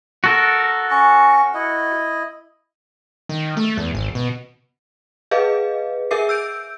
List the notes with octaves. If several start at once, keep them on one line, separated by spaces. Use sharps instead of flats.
F#4 A4 A#4
C#4 C#6
E4 D#5
D#3
A3
E2
G#1
B2
G#4 B4 D#5 F5
G#4 A#4 E5 D6 C7
E6 G6 D7